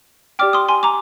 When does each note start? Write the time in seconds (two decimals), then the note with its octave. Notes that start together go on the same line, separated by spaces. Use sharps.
0.39 G4 D5 G5 D6 F6
0.53 C6 D#6
0.69 G#5 C6
0.83 A#5 D6